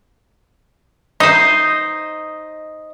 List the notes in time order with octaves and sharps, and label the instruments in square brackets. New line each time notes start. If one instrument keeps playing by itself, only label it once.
[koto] D#4 C5 [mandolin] D#5